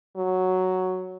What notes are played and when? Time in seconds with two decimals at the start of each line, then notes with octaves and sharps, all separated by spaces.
0.17 F#3